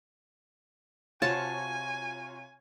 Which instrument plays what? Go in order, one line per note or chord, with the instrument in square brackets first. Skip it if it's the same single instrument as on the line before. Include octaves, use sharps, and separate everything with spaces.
[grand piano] C3 F#4 [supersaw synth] F4 C#5 [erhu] G#5 [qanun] A5